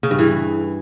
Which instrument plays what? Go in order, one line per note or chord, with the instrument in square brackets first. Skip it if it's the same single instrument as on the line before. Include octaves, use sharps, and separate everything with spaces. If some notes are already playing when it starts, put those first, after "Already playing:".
[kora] C#3
G2
E3